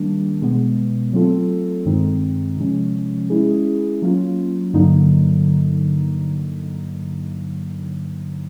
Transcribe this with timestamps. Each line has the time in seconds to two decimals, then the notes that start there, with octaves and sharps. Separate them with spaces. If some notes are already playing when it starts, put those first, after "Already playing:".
Already playing: D#3 G3 A#3 D4
0.42 B2 G#3 B3
1.13 F#3 A3 C4 F4 A4
1.85 G2 D#3 G#3 C4 D#4
2.57 C3 F3 G#3 C#4
3.30 G#3 C#4 E4 G#4
4.02 F#3 A#3 C#4 F4
4.74 G2 D3 F#3 A#3 D#4